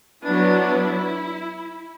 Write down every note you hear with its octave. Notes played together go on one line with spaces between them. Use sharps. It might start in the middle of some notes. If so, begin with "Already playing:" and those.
F#3 B3 D4 E4